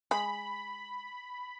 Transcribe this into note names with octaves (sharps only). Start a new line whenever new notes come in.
G#3 B5